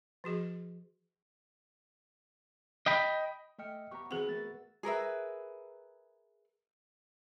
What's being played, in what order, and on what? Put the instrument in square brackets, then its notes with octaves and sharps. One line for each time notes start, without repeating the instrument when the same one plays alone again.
[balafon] F3 F#4 G#4 D#5
[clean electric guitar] D#5 G5 B5
[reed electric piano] A3 D#5 F6 [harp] E5 G5 C#7
[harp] B3 G4 [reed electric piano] A#5 C#6
[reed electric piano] E3 C4 [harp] B3 F#4 B4 [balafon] G#4 F#5
[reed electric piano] A3 B3 A#4 [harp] E5 A6
[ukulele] G#4 A#4 B4 E5